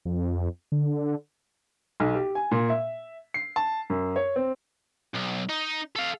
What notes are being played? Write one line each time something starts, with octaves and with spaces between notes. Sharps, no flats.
F2
D3
B1
G4
G#5
A#2
E5
C7
A5
F#2
C#5
C4
B1
D#4
A4 F5